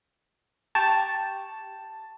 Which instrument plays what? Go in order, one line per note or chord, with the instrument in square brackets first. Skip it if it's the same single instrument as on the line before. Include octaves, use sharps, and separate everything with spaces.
[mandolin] G4 A#5 C#6 [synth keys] A5